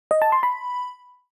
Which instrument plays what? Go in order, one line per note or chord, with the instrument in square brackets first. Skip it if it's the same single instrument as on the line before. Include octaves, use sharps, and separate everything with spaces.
[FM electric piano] D#5
A5
C6
B5